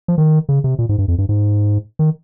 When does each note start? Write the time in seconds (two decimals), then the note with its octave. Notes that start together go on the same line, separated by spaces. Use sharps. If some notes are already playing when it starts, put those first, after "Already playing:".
0.08 F3
0.18 D#3
0.49 C#3
0.64 C3
0.79 A#2
0.89 G#2
0.98 G2
1.08 F2
1.18 G2
1.29 G#2
1.99 D#3